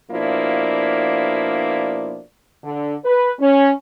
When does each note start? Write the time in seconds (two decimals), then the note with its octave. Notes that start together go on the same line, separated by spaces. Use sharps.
0.11 B2 F3 A#3 D4 E4 D5
2.64 D3
3.04 B4
3.40 C#4